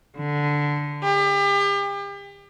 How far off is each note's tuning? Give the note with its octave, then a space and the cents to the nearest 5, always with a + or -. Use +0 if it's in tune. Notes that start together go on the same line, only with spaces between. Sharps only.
D3 -5
G4 +35